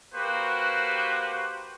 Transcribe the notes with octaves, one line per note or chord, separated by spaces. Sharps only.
A#3 F#4 G4 B4 C5